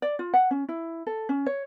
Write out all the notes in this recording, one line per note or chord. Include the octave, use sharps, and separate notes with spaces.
D5
F4
F#5
C#4
E4
A4
C#4
C#5